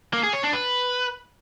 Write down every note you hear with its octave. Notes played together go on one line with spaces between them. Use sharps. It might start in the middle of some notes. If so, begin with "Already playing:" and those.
A#3
G#4
C#5
D4
B4